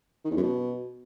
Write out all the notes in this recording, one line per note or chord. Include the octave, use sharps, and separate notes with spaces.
D#3
E2
F#2
B2